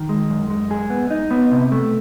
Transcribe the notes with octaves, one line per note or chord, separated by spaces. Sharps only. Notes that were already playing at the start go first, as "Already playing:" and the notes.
Already playing: D#3
G#3
F#2
G#3
G#4
B3
D#4
B3
C3
A3